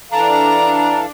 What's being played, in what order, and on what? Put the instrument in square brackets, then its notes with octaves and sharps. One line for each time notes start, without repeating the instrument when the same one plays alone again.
[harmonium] E3 A4 F5 [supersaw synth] D4 [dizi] A#5